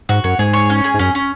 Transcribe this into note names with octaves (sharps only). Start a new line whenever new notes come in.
G#2 F#4
F#2 C#5
G#2 G#4
C#5
C#4
G#4
G#2
F#2 C#4
C#4